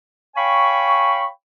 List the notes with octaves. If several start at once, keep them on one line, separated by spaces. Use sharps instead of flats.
C#5 F5 G5 G#5 B5 C#6